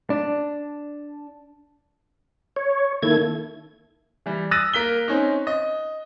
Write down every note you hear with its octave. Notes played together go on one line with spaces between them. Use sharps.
D4
C#5
D#3 A#3 E4 A4 G#6
E3 G3
D#6 E6 F#6 A6 A#6 D#7
A#3 A#4 B6 G7
C4 C#4 D#4
D#5